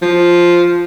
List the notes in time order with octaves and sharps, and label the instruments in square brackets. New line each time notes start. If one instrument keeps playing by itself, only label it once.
[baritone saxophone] F3